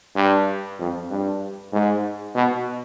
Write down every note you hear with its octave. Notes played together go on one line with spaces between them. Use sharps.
G2
F2
G2
G#2
B2